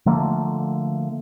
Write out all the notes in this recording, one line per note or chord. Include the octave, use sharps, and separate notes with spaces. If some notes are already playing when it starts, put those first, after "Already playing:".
D3 F3 A3 A#3